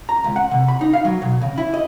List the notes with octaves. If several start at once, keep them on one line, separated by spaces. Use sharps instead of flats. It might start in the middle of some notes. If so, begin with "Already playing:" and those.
A#5
C#2
F#5
C3
B5
D#4
F5
F#3
B2
C#3
E4
D#5